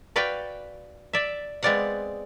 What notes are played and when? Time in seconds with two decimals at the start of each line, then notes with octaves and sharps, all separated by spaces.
0.16 F#4 B4 D5 F5 G5
1.13 D5 E5
1.63 G#3 B3 C4 D5 F5 F#5